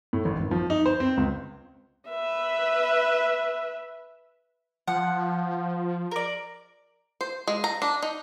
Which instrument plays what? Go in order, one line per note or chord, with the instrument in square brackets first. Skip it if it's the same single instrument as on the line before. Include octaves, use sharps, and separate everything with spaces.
[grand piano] A2
A1
G#1
F3
D#4
C5
C4
C#2
[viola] B4 E5
[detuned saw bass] F3 [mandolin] F#5
[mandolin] A#4 D5
[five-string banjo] C5
G#3
A#5
D4
D#4